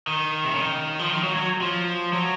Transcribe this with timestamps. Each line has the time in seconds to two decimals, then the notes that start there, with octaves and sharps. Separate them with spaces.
0.07 D#3
0.45 C3
0.51 C#3
0.58 D#3
0.99 F3
1.10 D#3
1.23 F#3
1.36 F#3
1.61 F3
2.13 F#3